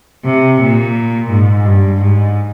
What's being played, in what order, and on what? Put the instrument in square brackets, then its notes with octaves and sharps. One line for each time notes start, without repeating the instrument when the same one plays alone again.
[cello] C3
A#2
G#2
G2
G#2